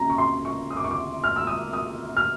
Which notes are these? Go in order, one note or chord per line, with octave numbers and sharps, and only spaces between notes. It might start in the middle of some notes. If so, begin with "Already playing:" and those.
Already playing: D#2 C#3 A#5
C#6
C6
C#6
D#6
D6
C#6
D6
F6
E6
D#6
D#6
F6